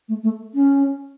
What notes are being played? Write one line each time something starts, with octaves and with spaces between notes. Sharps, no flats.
A3
A3
C#4